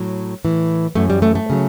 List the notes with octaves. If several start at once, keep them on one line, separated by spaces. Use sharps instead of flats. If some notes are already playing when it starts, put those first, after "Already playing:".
Already playing: A2 F#3
A2 E3
F#2 E3 A3
G3
A3
A3
C#3 F#3